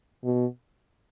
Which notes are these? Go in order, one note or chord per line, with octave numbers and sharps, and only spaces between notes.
B2